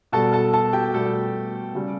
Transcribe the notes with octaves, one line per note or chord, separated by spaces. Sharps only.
B2 G3 A4 A5
A4 A5
A4 A5
G4 G5
B2 G3 A3 A4
C#3 G3